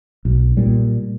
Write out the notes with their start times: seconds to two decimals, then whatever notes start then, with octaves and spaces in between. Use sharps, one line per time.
0.25 B1
0.57 A#2 G3